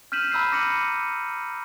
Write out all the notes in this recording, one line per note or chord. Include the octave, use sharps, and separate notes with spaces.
F6 G6 B6 D#7 E7 F#7
A#5 B5 E6 F6 G6 C7
D6 A#6 C#7 D#7 F#7